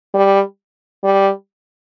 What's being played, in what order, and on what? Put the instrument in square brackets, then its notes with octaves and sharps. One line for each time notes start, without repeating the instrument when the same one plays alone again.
[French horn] G3
G3